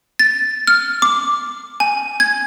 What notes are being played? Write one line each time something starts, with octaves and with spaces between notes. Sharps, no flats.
A6
F6
D6
G#5
G#6